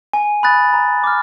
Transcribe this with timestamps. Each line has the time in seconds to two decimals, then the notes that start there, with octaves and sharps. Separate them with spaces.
0.13 G#5
0.43 B5 D#6 F#6 A6
0.74 A#5
1.04 D6 F6